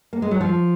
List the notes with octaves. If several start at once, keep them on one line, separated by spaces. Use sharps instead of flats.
A#3
G#3
F#3
F3